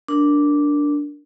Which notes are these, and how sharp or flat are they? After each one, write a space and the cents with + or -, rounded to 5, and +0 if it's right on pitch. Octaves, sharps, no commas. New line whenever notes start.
D4 -5 A#4 +0